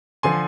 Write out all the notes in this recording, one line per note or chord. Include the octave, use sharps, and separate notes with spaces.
D3 F3 G#5 C6